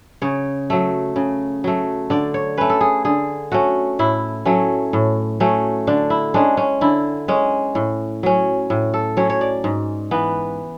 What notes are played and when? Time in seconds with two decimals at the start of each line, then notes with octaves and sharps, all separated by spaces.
0.22 C#3 C#5
0.70 F#3 A3
1.16 C#3
1.64 F#3 A3
2.10 D3 D5
2.34 C#5
2.57 A3 C#4 B4
2.70 A4
2.81 G#4
3.05 D3 G#4
3.52 A3 C#4 F#4
3.99 A2 E4
4.45 F#3 A3 C#4
4.93 A2
5.40 F#3 A3 C#4
5.87 D3 D4
6.10 E4
6.34 G#3 C#4 D4
6.57 C#4
6.81 D3 E4
7.28 G#3 C#4
7.75 A2
8.23 F#3 C#4
8.70 A2
8.94 A4
9.17 F#3 C#4 C#5
9.30 C#5
9.41 D5
9.64 G#2
10.11 E3 B3